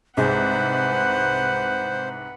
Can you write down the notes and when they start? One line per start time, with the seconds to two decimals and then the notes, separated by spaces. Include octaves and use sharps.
0.17 C2 G#2 G#3 B4 C5 F#5